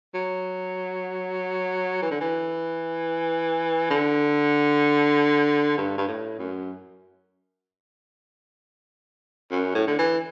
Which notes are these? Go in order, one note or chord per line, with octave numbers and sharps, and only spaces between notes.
F#3
E3
D3
E3
D3
G2
G2
A2
F#2
F#2
A2
D3
E3